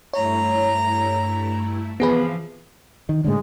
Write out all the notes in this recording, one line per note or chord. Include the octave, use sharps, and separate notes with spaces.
G2 A3 E4 C#5 A#5
C3 E3 F3 B3 G#4 B4 F5
D#3
A2 D3 G#3